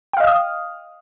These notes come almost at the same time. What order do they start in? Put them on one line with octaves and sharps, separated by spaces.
G5 F5 D#5 F6 D#6